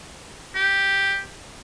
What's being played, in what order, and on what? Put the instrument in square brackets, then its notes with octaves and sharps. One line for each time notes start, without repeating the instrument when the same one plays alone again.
[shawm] G4